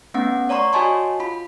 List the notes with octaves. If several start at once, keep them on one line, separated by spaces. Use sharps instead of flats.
A3 B3 C#4 F#5
C#5 D5 A#5 C6 C#6
F#4 C#5 D#5 G#5 A5 C6
F4 B5